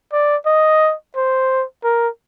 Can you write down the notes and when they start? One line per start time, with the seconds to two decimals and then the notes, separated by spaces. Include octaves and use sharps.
0.13 D5
0.46 D#5
1.16 C5
1.84 A#4